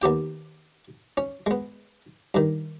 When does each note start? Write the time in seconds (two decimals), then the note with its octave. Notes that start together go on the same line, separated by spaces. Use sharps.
0.02 D#2 B3 G4 G5
1.17 C#4
1.46 G#3 B3
2.34 G2 D#3